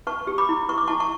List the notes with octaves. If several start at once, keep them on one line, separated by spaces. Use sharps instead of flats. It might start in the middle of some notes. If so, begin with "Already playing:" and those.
B4 A5 C#6
G4
B5 D6
E4
B4 C#6
D6
E4 A5 C#6
A5 C#6